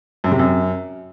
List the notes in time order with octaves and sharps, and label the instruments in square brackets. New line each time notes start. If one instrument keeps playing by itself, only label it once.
[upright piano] F#2
C3
F#2